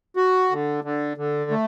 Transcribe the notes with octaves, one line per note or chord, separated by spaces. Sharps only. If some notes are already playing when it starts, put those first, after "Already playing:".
F#4
D3
D3
D3
A3